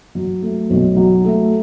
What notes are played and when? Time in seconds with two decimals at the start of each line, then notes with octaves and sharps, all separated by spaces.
0.15 F#3
0.42 A3
0.70 B1
0.96 F#3
1.24 A3